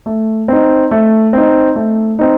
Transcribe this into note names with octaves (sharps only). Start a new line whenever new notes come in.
A3
C4 D#4
A3
C4 D#4
A3
C4 D#4